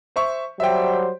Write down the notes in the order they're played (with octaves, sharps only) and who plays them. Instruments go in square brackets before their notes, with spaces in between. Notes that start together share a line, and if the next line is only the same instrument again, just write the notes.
[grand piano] C5 E5 C#6
[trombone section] F#3 G3 C5 [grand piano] E5 G5